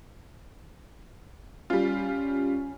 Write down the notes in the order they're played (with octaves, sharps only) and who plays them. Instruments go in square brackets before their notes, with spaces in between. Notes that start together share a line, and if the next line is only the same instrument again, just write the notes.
[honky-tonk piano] G3 F4 [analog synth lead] C#4